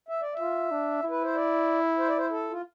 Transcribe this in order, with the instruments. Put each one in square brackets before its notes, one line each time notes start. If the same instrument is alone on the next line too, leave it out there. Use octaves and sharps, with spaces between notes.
[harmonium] E5
D5
E5
[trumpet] F4
D4
E4
[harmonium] B4
C5
D5
C5
D5
C5
A4
F4